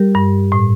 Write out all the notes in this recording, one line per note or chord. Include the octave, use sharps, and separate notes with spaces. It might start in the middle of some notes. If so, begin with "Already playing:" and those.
Already playing: G3 G4 A#4
G2
A2